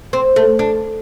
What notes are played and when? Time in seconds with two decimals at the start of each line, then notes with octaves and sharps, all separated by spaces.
0.13 C4
0.36 A3
0.59 D4